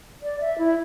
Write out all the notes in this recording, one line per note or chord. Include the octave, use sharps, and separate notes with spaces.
D5
E5
E4